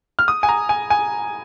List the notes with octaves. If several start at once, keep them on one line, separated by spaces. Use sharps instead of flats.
F6
D#6
G#5
A#5
G#5
G#5